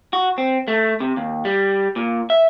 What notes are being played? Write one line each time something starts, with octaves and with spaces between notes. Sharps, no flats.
F#4
C4
A3
C3
D#2
G3
A#2
E5